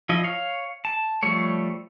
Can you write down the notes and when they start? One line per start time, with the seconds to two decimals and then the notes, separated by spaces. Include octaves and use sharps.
0.09 F3 E4 D#5
0.24 C#5 F5
0.85 A5
1.23 F3 G3 A3 C#5